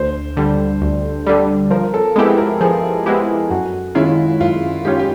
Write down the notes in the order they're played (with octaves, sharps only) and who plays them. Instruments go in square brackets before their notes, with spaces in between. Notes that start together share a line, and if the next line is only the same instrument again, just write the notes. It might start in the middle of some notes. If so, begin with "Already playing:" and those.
Already playing: [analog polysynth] D2 [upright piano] C5
[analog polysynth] D3 G3
D2
D3 G3
[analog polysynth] F3 [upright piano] A#4
[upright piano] A4
[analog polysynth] G#3 B3 E4 G4 [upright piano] G#4
[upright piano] A#4
[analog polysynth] F3 [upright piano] G#4
[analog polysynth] G#3 B3 E4 G4
[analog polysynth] F#2 [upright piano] F#4
[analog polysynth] D#3 G#3 C#4 F4 [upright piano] E4
[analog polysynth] F#2 [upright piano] F4
[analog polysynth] D#3 G#3 C#4 F4 [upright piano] G4
[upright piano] G4